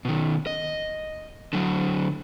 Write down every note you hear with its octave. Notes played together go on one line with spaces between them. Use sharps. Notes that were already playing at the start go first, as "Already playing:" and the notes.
B2 D#3
D#5
D3 F#3